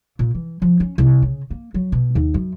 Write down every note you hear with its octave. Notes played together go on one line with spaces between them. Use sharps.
A#2
E3
F3
C#4
C2
C#3
A#3
F#3
B2
D#2
F#2